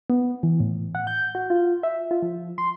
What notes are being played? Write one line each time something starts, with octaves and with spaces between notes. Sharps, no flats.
B3
E3
A2
F#5
G6
F#4
F4
E5
F4
F3
C6